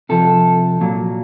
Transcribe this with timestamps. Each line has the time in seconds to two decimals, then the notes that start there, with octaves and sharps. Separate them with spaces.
0.09 C3 F3 A4
0.81 A#2 F#3